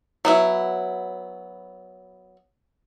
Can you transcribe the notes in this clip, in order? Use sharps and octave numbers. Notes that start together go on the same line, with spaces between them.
F#3 B3 E4